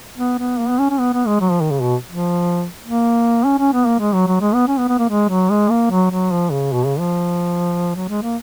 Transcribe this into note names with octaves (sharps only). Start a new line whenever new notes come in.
B3
B3
A#3
B3
C#4
C#4
B3
B3
G#3
F#3
F3
D#3
C#3
B2
F3
A#3
C#4
C#4
B3
A#3
G#3
F#3
F#3
G#3
B3
C#4
B3
B3
A#3
G#3
F#3
G#3
A#3
F#3
F#3
F3
C#3
B2
C#3
F3
F#3
G#3
A#3